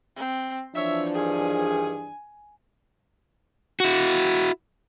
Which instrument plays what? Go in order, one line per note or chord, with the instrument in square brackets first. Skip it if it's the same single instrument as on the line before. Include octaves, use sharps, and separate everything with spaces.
[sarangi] C4
[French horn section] E3 F3 D4 [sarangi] C#5 [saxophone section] E5
[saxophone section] G2 D#3 G#4 [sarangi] G#5
[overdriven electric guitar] E4 F#4